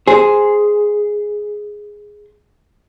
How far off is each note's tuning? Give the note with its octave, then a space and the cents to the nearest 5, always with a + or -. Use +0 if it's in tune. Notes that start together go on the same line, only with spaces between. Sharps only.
G#4 +0 C5 +0